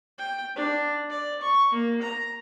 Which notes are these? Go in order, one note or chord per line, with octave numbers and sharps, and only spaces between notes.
G5
D4
D5
C#6
A#3
A#5